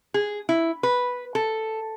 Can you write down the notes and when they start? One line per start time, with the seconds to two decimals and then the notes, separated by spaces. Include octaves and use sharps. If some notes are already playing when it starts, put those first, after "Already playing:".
0.14 G#4
0.49 E4
0.83 B4
1.35 A4